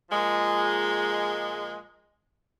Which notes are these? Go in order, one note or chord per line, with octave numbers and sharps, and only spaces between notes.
A#2 F3 G#3